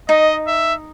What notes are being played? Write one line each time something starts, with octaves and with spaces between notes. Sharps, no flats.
D#4 D#5
E5